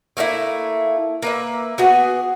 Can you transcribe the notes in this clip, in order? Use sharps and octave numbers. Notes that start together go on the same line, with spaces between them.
A3 A#3 D#4 E4
A#3 B4 E5
B3 F#4 G#4